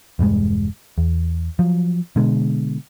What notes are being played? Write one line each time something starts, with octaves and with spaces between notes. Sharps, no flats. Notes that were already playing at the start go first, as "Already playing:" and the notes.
E1 G2 G3 G#3
E2
F3 F#3
B2 D3 G#3